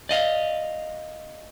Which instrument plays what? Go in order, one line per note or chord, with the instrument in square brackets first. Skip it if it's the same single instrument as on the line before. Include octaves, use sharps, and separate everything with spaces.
[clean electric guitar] D5 D#5 F5